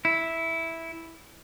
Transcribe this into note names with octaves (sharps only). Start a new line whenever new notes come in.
E4